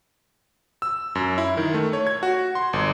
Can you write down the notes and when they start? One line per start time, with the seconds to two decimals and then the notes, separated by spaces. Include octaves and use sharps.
0.82 E6
1.15 F#2
1.38 E4
1.57 D#3
1.74 A3
1.93 C#5
2.07 G#6
2.23 F#4
2.55 C6
2.73 G1